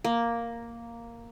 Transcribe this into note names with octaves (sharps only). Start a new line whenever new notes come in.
A#3